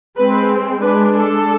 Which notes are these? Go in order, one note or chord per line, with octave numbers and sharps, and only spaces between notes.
G#3 C4 B4
G#3 D4 B4
A4